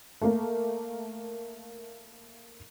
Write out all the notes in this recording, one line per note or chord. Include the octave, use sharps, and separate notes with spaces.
A3 A#3 A#4